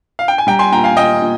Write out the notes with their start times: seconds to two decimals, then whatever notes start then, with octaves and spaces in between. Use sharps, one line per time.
0.19 F5
0.28 G5
0.38 G#5
0.47 G3 G5 A#5
0.59 G#5 C6
0.72 A#2 G5 A#5
0.84 F5 G#5
0.97 A#2 D#5 G5
1.22 A#2